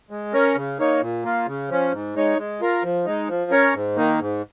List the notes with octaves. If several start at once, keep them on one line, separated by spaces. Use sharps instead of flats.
G#3
C#4 A#4 C#5
C#3
A#3 D#4 C#5
A#2
A#3 F4
C#3
F3 C#4
G#2
G#3 D#4 C#5
G#3
F4 A#4
F3
G#3 D#4
F3
C#4 A#4 C#5
G#2
D#3 A#3 D#4
G#2